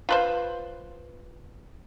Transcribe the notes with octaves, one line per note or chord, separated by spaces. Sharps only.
F4 B4 C5